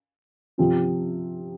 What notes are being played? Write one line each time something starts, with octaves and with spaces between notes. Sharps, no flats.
C3 F3 C4 F4